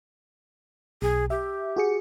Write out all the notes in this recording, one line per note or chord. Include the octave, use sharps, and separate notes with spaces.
B1 G#4
G4 E5
F#4 G#4 C#7